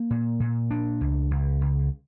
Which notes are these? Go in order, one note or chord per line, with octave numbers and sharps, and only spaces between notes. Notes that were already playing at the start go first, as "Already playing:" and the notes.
Already playing: A#3
A#2
A#2
D4
C#2
C#2
C#2